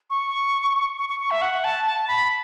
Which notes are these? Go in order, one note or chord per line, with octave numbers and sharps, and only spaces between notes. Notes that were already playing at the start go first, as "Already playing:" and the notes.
C#6
C#6
C#6
C#6
E5
F#5
A5
A5
B5